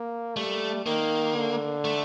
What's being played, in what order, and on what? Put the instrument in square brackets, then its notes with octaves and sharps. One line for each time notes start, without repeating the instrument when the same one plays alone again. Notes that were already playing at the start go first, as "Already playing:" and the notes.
Already playing: [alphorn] A#3
[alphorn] G3 [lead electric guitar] A3
[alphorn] D#3 [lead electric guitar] A#3
[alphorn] D3
[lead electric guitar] A3